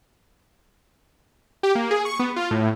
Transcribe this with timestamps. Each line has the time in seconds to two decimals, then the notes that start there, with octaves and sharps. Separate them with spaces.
1.63 G4
1.75 A#3
1.91 G#4
2.05 C#6
2.19 B3
2.36 F4
2.51 A2